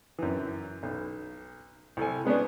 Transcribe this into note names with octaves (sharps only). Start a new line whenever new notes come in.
F#2 E3
B1
C2 A4 G#5
G#3 B3 C#4 D4